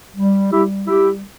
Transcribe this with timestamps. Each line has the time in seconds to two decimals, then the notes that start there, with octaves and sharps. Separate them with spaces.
0.16 G3
0.51 G3 E4 G4
0.87 G3 E4 G4